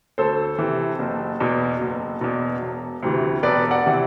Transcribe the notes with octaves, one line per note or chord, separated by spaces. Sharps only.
D2 A4 C5
C3 E3
F#1
E2 B2
F#1
E2 B2
E1
D2 C3 E3
E1 B4 D5
D5 F#5
C3 E3